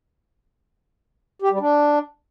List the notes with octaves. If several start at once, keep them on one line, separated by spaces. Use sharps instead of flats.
G4
G3
D4